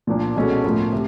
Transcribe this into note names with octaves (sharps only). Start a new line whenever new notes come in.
A#2 F3 A#3 D4
B2 G#3 C#4 F#4 A4
A2 F3 A#3
C3